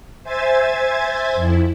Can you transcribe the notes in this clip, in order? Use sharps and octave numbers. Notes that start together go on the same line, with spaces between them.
C5 E5 G#5 G#6 A6
F2 E4